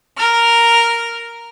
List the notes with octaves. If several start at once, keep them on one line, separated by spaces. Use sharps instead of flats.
A#4 F6